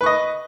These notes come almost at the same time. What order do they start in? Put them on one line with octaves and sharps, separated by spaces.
B4 C#6 D#5